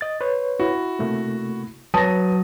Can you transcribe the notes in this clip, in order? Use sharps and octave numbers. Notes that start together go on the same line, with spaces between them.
D#5 A6
B4 C#5
E4 F#4
C3 A3 A#3
F#3 B4 A5 D#6 A#6